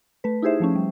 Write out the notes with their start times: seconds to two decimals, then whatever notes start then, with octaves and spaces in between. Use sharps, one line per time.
0.24 A3 B4
0.42 D#4 E4 G4 G#4 C5 E5
0.60 F3 A3 C#4
0.75 G3